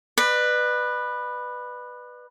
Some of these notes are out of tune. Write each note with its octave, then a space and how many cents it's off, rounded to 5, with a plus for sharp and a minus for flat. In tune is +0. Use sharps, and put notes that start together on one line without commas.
B4 +0 D5 +40